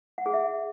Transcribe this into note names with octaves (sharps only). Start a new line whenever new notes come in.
F#5
G#4
E5